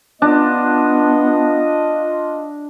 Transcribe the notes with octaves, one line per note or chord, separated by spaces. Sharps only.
B3 D4 F4 D#5